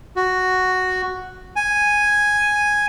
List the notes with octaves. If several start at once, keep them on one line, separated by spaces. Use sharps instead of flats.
F#4
G#5